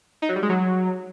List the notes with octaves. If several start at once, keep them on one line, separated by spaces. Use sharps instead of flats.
D#4
F#3
G3
G#3
F#3